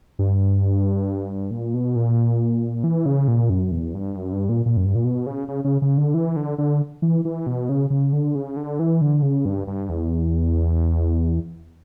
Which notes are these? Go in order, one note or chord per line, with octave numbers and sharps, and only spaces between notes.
G2
A#2
B2
A#2
E3
C#3
A#2
F#2
E2
G2
F#2
G2
A#2
A#2
F#2
G2
A#2
B2
C#3
C#3
C#3
C#3
D3
E3
D3
D3
E3
E3
B2
C#3
C#3
D3
C#3
D3
E3
D3
C#3
G2
G2
E2